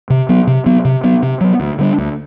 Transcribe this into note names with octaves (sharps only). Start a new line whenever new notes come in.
C3
F#3 B3
C3
F#3 B3
C3
F#3 B3
C3
F#3 B3
D2
D3 G3 D4
D2